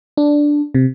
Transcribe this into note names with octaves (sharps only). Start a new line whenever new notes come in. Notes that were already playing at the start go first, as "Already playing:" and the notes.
D4
C3